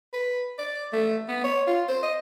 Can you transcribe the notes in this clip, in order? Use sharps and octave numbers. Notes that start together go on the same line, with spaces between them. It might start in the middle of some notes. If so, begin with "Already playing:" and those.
B4
D5
A3
B3
C#5
F4
C5
D#5